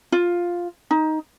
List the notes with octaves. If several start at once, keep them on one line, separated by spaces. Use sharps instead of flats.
F4
D#4